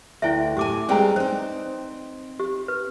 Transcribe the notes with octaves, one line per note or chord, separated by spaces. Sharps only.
D2 E4 B4 D5 E5 G5
A2 G4 G#5 D6
G3 G#3 C4 B4 G5 G#5 A#5
C4 D#4 C5
G4
B4